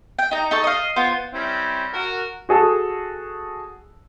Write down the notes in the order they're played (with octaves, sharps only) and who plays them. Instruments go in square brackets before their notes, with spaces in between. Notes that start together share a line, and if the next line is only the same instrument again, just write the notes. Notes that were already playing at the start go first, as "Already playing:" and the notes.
[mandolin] G5
D#4 A#5
D#4 A4 C#6
D#5 F5
B3 F4 C5
[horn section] G3 C4 C#4 E4
F#4 A#4
[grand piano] F#4 G#4 A4